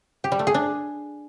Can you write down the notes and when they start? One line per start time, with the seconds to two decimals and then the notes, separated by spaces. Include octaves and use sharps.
0.24 G4
0.32 G3
0.39 A3
0.47 G#4
0.54 D4